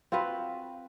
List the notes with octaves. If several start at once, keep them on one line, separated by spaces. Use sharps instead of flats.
C4 F4 F#4 B4